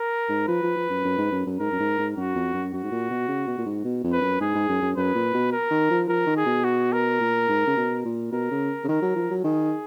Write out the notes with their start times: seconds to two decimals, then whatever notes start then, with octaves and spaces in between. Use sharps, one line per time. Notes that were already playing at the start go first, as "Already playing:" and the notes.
Already playing: A#4
0.29 G#2
0.48 F3 B4
0.63 F3
0.77 F3
0.90 F#2
1.05 F#2
1.18 G#2
1.32 F#2
1.46 F#2
1.60 G#2 A#4
1.72 F#2
1.80 G#2
1.98 G#2
2.16 F#2 F#4
2.35 F2
2.54 F#2
2.73 F#2 F#4
2.83 G#2
2.92 A#2
3.10 B2
3.28 C#3
3.47 B2
3.58 A#2
3.66 G#2
3.85 B2
4.04 F2
4.12 B4
4.21 F#2
4.40 G#2 G#4
4.55 G#2
4.69 F#2
4.82 F#2
4.96 F#2 B4
5.15 A#2
5.34 B2
5.52 A#4
5.71 D#3
5.90 F3
6.08 F3 A#4
6.27 D#3
6.37 G#4
6.46 B2
6.64 F#4
6.92 A#4
7.21 A#2
7.49 G#2
7.67 C#3
7.77 B2
8.05 A#2
8.32 B2 A#4
8.51 C#3
8.84 C#3
8.88 D#3 A#4
9.02 F#3
9.16 F3
9.31 F#3
9.44 D#3 G#4